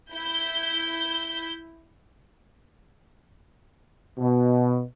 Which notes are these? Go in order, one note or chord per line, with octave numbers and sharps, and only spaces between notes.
E4 G6
B2